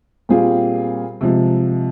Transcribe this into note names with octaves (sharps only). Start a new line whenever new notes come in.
A#2 G3 C4 F4 G#4
C3 F3 G#3